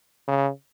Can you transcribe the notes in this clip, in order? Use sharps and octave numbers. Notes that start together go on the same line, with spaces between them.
C#3